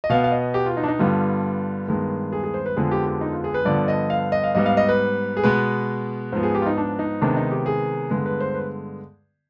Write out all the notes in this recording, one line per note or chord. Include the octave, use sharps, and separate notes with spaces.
D#5
B2 B3 F5
F5
D#5
G4
F4
D#4
D4
D#4
G2 D3 G3 B3 F4
G2 D#3 G#3 B3
G#4
G#4
C5
B4
F2 D3 F3 G#3 B3 G#4
G4
G4
D#4
F4
G#4
B4
G2 D3 F3 B3 D5
D#5
F5
D#5
F5
G#2 G3 B3 D#5
F5
D#5
B4
G#4
B2 G#3 B3 B4
G#2 F3 B3 C5
G#4
G4
F4
D#4
D4
D#4
C3 D#3 G#3 B3 D4
D#4
G4
G#4
G2 D3 G#3 B3 B4
B4
C5
B4